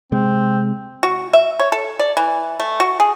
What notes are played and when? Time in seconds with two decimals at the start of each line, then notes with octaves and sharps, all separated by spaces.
0.12 C3 G#3 C4
1.03 F#4
1.33 E5
1.60 C#5
1.72 A4
1.99 D5
2.17 E3
2.60 A3
2.80 F#4
3.00 G#4